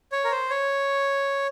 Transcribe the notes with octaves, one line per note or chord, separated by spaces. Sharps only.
C#5
A#4
C5
C#5